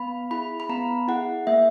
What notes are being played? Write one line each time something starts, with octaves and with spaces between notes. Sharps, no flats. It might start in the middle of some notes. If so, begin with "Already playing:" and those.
Already playing: B3 B5
E4 G#4 B5
B5
B3 A#5
E4 G#4 F#5
A#3 E5